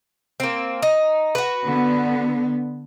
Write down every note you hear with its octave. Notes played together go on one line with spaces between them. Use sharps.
A#3 C4
D#4
F#4 B4
D3 B3